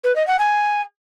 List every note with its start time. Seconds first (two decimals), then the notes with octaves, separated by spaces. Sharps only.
0.04 B4
0.15 D#5
0.27 F#5
0.39 G#5